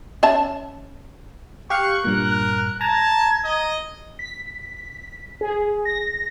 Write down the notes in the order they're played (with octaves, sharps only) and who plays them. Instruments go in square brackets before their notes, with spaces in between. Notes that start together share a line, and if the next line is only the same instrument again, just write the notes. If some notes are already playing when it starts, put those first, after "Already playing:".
[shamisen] C#4 E5 A5
[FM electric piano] G4 F5 [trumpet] C#6 [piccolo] F#6
[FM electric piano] G2 A#2 [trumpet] A#4
[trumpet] A5 [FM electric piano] A#5 [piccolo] G#6
[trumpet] D#5
[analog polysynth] B6
G#4
A#6